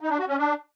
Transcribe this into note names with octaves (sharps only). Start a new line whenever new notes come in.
D#4
D4
F#4
C#4
D4